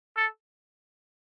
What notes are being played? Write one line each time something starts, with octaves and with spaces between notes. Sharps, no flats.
A4